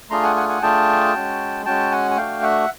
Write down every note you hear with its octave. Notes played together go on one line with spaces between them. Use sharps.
A3 D4 F4 G#4 A#5 C6
F#5 G#5
F#5 G#5
F#5 G#5
A3 D4 F4 G#4 G5 A5
G#3 C#4 F#4
G#3 C#4 F#4 G5 A5
F#5 G#5
G#5
A3 D4 F#4 F5 G5
E5 F#5